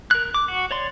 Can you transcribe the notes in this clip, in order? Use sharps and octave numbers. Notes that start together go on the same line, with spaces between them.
A#4 F#6
D6
F#4
C#5 D5 C6